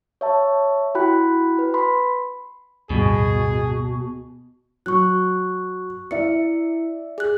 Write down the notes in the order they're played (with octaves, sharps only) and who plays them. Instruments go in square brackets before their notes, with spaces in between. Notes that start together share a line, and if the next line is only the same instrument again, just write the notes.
[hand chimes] C#5 E5 A5
E4 F#4 G5 B5 F#6
B4
B5 C6
[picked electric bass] D1 G2 [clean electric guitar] B2 [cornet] G#4
[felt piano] F#3 [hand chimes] C#6 F#6
[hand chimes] E4 C#7 [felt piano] D5 E5
[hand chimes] G#4 F#6